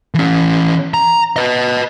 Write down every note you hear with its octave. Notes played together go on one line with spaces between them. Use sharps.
E3 C#4
A#5
B4 D#5